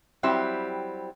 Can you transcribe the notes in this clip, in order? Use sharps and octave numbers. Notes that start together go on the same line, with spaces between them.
F#3 G3 C4 E4 G4